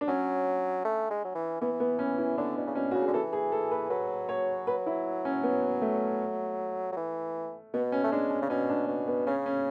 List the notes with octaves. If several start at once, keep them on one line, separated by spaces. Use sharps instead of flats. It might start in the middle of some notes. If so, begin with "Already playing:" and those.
D4
F#3 C#4
A3
G#3
F#3
E3
E3 B3
B3
C#4
E4
D3 D4
B2
C#3
B2 C#4
C#3 F#4
G#4
D3
E3 A4
G#4
A4
B4
F#3 B4
C#5
B4
E4
C#4
B3
A3
F#3
E3
B2 B3
C#4
A3
G#3 D4
C#4
C#3
B2 C#4
D4
B2
B3
C#3 C#4
C#4